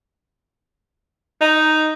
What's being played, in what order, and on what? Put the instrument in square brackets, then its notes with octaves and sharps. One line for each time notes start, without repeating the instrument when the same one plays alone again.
[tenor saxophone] D#4